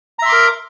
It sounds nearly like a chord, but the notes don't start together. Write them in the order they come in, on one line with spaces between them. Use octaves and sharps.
A#5 E5 C6 D6 A#4